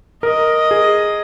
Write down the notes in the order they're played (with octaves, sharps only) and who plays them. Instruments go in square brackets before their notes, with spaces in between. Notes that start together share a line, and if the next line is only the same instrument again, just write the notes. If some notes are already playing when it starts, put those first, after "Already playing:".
[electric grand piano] A#4 [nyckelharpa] D#5
[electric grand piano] G#4